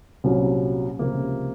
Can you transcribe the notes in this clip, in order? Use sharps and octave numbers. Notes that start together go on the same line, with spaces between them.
C2 A#2 F#3 C#4
C#2 C3 F3 A#3